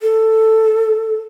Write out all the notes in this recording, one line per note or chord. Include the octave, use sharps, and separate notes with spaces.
A4